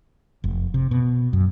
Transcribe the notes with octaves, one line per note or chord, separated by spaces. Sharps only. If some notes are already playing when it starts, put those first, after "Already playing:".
F1
C3
B2
F#2